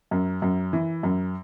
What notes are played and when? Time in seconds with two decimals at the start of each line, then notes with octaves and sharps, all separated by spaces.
0.11 F#2
0.42 F#2
0.73 E3
1.03 F#2